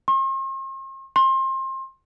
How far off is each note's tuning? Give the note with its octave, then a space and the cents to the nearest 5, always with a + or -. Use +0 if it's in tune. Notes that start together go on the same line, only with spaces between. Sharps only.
C6 +45
C6 +25